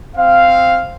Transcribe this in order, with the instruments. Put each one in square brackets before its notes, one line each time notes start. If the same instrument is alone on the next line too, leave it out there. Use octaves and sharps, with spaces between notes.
[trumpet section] C4 F5